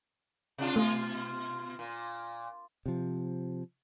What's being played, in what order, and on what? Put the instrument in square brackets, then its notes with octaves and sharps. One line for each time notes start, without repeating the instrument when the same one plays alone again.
[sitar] C3 D4 F4
[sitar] B2 F4 [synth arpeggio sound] A3
[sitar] A#2
[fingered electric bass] C3 F3